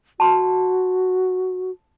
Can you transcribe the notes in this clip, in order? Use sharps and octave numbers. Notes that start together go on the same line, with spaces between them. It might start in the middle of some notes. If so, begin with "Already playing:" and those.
F#4 A5 C6